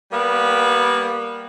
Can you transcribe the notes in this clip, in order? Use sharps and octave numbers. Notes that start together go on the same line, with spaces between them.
G3 A#3 B3